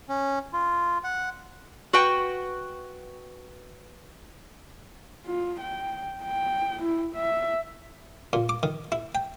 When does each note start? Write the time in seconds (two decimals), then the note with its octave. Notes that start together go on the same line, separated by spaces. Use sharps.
0.09 C#4
0.53 F4
1.04 F#5
1.93 F#4 B4 G5
5.26 F4
5.61 G5
6.23 G5
6.83 E4
7.16 E5
8.33 A#2
8.49 D6
8.63 D#3
8.92 E4
9.15 G5